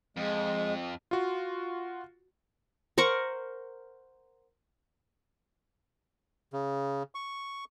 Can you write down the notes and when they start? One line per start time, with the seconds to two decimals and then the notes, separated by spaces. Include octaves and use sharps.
0.17 F2 G#3
1.11 F4 F#4
2.98 A#4 C5 F#5 C#6
6.53 C#3
7.15 C#6